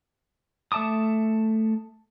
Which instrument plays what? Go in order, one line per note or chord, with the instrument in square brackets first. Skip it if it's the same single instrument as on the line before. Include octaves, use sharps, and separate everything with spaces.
[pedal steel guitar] A3 E5 A5 D6 D#6